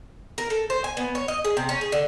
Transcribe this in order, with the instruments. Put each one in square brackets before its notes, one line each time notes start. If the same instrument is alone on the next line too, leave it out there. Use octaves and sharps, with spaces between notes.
[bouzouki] A#4
A4
C5
G#5
B3
C#5
D#5
G#4
C3
C#4
G#4
D3